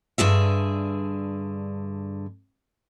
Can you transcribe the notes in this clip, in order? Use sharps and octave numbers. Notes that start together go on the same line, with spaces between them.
G2 D3 G#4 E5